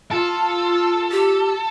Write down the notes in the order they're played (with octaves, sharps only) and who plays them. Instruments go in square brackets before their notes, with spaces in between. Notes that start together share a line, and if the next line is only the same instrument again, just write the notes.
[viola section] F4 [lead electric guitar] A4 [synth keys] A5
[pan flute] G4